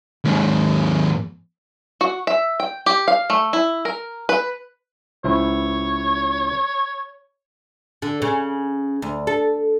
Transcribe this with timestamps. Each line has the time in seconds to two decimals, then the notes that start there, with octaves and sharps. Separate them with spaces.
0.25 D#2 G#2
2.01 F#4
2.27 E5
2.60 G5
2.86 G4
3.08 F5
3.30 A3
3.53 E4
3.85 A#4
4.29 B4
5.24 C#2 E4 C5 C#5
8.02 D3
8.22 C#3
9.02 D2
9.27 A4